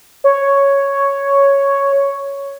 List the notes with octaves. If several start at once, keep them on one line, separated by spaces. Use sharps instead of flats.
C#5